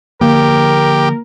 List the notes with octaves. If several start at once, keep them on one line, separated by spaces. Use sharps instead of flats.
D3 F3 A#3 G4 A#4